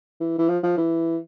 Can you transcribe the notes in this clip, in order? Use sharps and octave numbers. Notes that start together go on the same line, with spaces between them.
E3
E3
F3
F3
E3